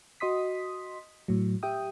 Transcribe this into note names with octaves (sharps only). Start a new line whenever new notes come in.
F#4 D#5 C6 D#6 B6
A2 F#3
G4 E5 G5 D#6